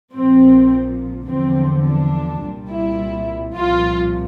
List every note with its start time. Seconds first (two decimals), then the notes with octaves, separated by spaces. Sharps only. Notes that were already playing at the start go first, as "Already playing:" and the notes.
0.14 A#1 A#2 F3 C4
1.28 E2 D3 F3 C4
1.85 D4
2.42 C2 A#2 G3
2.70 E4
3.56 C2 A#2 F3 F4